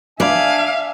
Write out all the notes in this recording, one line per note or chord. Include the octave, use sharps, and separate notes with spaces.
D4 D5 E5 F5 G#5